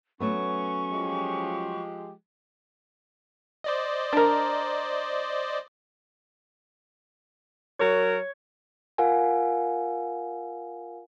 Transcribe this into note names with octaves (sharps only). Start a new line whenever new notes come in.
F#3 A3 B3 C#4 C#6
F3 G#3 G4
C5 D5 D#5
D4 A#4
F#3 A#4 C#5
F4 A#4 F5 F#5 G#5